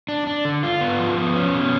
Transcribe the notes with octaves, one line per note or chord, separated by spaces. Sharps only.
D4
D4
D3
F4
B3
F3
B3
C#4
B2